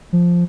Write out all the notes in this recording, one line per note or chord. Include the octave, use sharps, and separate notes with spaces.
F3